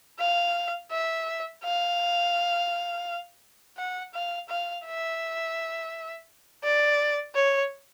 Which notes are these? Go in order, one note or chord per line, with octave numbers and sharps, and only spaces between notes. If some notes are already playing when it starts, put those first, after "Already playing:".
F5
E5
F5
F#5
F5
F5
E5
D5
C#5